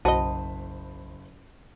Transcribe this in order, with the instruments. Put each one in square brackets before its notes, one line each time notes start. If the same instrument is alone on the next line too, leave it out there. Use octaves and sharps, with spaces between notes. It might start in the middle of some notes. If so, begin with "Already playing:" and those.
[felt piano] F#1 C5 B5 [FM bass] B1 [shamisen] F#4 D#5 [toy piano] A5